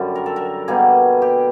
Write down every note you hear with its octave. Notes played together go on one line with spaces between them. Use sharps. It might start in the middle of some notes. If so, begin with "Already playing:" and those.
Already playing: F#2 D3 G3
A#4
A4
A#4
B2 G3 A#3 G#4
G4